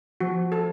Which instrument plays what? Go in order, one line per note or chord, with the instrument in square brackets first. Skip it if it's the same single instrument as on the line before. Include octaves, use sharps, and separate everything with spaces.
[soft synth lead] F3 [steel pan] F#4
[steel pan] A4